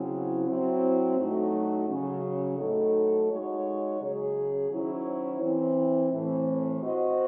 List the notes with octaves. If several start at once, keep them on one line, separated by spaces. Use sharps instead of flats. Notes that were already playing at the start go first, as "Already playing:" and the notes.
Already playing: C#3 F#3 C4 E4
F#3 C4 E4
A2 F#3 A3 D#4 F#4
C#3 F#3 C#4
A2 F#3 A3 D#4 A4
G#3 D#4 F#4 C#5
C#3 F#3 C#4 G#4
D#3 F#3 C#4 E4 C5
E3 C4 E4
A2 E3 C4
C4 F#4 C5 D#5